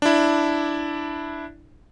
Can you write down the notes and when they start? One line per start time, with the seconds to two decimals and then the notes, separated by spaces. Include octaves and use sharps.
0.02 D4 E4